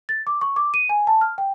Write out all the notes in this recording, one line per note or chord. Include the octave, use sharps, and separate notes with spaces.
A6
D6
C#6
D6
D#7
G#5
A5
F6
G5